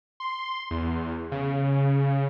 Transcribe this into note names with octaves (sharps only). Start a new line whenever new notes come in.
C6
E2
C#3